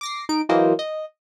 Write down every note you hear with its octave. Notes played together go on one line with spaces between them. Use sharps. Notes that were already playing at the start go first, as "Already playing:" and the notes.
D6 A#6 C7
D#4 D7
E3 F#3 A#3 C5 D#5
D#5